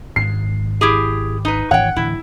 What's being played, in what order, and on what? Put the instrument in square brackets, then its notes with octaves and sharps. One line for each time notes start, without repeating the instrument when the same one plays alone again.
[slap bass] G#1 G#2 [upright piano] C7
[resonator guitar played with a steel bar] E4 G4 G#4
D#4 B4
[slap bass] G#1 E3 [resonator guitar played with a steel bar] C#5 G5 [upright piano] F#5
[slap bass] D1 E3 [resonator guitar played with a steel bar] E4